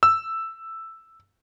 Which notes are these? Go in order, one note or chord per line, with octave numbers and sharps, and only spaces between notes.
E6